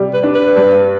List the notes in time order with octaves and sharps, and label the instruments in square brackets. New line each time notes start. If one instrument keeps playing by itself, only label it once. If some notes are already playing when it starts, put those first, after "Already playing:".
Already playing: [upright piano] C3 G3
[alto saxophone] B4
[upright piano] D4
[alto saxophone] B4
[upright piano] G2